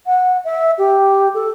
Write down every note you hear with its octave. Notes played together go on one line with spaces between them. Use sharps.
F#5
E5
G4
A4